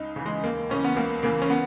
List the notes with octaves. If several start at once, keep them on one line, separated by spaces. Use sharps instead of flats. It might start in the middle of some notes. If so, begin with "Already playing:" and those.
Already playing: C#2 D#4
C#3 E3
G#3
D#2 A#3
C#3 E3 C#4
B3
C#2 A#3
C#3 E3 A#3
C#4
B3